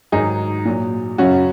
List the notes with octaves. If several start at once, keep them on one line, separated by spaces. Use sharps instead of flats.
G#2 D#3 F#3 D#4 G#4
A#2 F#3
F#2 C#3 F#3 C#4 F#4